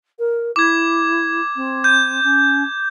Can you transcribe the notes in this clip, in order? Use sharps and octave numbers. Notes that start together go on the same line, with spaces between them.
A#4
E4 D6 G#6
C4
G6
C#4